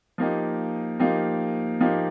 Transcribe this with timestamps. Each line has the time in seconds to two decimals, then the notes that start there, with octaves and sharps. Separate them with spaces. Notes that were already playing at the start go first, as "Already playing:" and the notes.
0.18 F3 A#3 D#4 G4
1.00 F3 A#3 D#4 G4
1.81 F3 A#3 D#4 G4